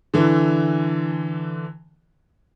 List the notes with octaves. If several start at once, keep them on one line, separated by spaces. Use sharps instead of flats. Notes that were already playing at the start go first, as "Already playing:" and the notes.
D3 E3